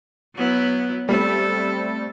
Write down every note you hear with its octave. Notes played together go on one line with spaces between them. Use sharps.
F#3 B3 E4
G3 A3 C4 A4